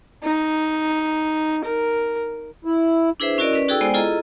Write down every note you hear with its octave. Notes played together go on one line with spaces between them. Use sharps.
D#4
A#4
E4
D4 E4 G#4 B4 C5 E5
C#4 E4 F#4 A#4 D5 D#5
C#4 B4 D5
D#4 F#4 G#4 A4 G5 E6
G#3 B3 C5 D5 G5 G#5
E4 F4 G#4 A4 D#5 A#5